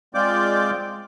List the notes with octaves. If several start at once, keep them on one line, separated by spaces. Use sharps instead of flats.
G#3 C4 F4 D5 D6 G6